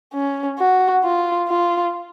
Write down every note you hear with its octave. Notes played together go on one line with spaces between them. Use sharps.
C#4
F#4
F4
F4